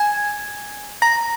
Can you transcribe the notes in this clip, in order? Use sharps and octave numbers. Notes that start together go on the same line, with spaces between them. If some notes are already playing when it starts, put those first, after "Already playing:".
Already playing: G#5 G#6
A#5 A#6